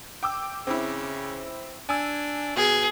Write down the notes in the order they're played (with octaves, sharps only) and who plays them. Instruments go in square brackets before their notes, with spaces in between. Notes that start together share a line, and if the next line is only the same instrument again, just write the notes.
[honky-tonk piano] G5 D6 E6
[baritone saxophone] C#3 [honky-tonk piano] C4 E4
[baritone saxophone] D4 [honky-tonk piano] G#5 E6
[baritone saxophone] B2 [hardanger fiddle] G#4